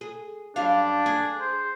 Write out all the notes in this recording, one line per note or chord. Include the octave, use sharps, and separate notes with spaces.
G#4
F#2 G3 D4 F5
G#4
C5